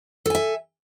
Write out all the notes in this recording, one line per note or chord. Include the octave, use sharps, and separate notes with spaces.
A4 E5 G#5